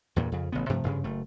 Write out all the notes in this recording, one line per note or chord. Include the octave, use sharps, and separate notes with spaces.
E2 G2 A#2
F2 C#3
A1 C#3 B3
G2 C3 F3 A3
F1 G2 C#3
F#1 A3